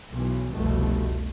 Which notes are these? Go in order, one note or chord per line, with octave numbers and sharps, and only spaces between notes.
B1 E3
F1 C2 B2 A3